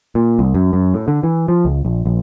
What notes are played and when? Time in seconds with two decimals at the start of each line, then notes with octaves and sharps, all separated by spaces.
0.15 A#2
0.39 C2
0.54 F#2
0.73 F#2
0.94 A2
1.08 D3
1.23 E3
1.48 F3
1.65 C#2
1.85 A#1
2.06 A#1